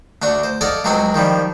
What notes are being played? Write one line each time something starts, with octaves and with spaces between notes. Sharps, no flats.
D2 D4 F#4 C#6
C5
A4 D5 D#5 F5 F#5 G#5
C#2 F#3 G#3 C4 F#4 G#5
D#3 F3 G3